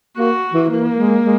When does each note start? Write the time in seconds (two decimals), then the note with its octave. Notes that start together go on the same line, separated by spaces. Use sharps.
0.17 A#3 F#4
0.53 E3
0.70 E3 A#3
0.97 G#3
1.23 G#3